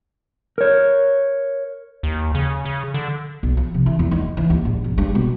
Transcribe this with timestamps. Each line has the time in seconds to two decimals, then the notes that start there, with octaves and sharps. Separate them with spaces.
0.58 A#4 C#5
2.03 D#2
2.35 C#3
2.65 C#3
2.94 D3
3.43 B1
3.57 F3
3.74 C3
3.86 E3
3.99 E2
4.11 D#4
4.37 E3
4.50 D#2
4.65 A#1
4.84 B2
4.98 G2
5.15 B2